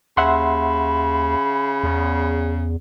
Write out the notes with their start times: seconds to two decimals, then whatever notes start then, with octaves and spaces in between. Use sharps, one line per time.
0.17 D#2 C#3 E5 F#5 B5 C6
1.83 E2